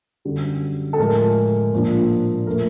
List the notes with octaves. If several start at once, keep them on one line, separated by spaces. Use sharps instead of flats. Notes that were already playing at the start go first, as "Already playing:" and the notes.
F#2 D3 G3
A4
A2 F3 G#3 A#4
A#2 F3 A#3 D4
A#2 F3 A3 A#4